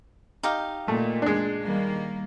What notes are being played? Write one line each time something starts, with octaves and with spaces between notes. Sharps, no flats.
D#4 G4 F5
A#2 A3
G#3 D4
D#3 G3 A#3